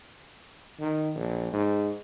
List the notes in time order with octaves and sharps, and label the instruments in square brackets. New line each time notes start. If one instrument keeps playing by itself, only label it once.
[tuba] D#3
A#1
G#2